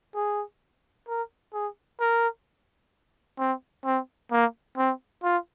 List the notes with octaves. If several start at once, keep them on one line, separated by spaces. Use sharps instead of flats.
G#4
A#4
G#4
A#4
C4
C4
A#3
C4
F4